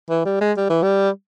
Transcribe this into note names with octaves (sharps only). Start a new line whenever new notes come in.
E3
G3
G#3
G3
E3
G3